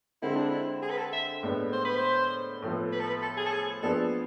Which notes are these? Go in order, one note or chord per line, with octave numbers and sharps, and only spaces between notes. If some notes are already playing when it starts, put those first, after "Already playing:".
D3 G#3 C4 E4
D4
E4
G#4
B4
A4
E5
A2 G#3 B3 D4
C5
B4
C5
A2 F3 B3
B4
A4
B4
A4
G#4
A4
G#4
F3 B3 D4 G#4 A4 D5